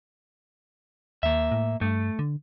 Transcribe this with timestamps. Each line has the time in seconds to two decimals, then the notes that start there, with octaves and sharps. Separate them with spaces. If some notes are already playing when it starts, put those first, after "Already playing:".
1.23 D#2 A#3 E5
1.52 A2
1.81 G2 A3
2.19 D3